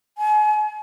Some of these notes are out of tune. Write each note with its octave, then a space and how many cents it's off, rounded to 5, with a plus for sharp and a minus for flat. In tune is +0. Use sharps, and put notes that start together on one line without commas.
G#5 +40